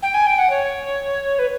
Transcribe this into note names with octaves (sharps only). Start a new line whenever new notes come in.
G5
G#5
G5
F#5
C#5
B4